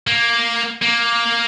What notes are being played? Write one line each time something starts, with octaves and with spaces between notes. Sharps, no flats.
A#3
A#3